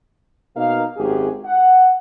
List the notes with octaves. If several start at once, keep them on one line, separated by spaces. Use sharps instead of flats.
B2 A#3 D#4 A#4 F5
G#1 F#2 G4 G#4
F#5